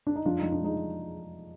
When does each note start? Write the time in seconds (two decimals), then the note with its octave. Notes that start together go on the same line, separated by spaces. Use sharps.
0.07 D4
0.16 D#4
0.26 F2 D4 F4
0.39 F2 D#4
0.52 D4
0.61 G#3 D#4